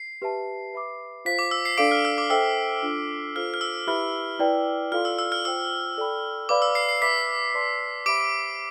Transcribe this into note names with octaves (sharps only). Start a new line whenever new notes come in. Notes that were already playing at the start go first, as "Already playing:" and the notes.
Already playing: C7
G4 B4 E5 A5
B4 E5 B5 D6
F4 C5 F5 B6
D6
E6
C7
D4 A4 D5 F5 D6 D7
F6
E6
D6
A4 C5 E5 G5 E6
D4 F4 A4
F4 A4 C5 F5 F6
F6
E6
E4 G4 B4 E5 B5 F6
E4 B4 D5 G5
F4 A4 D5 F5 C6 F6
E6
E6
F6
F4 C5 G5 E6
A4 D5 G5 B5
B4 D5 F5 B5 D6
E6
C7
C7
B4 E5 B5 D6 B6
B4 D5 A5 C6
G4 C5 E5 B5 D6 D7